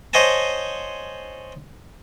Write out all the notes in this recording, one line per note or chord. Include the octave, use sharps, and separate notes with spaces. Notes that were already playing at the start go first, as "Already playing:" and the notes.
C5 C#5 D#5 F#5 G#5 A5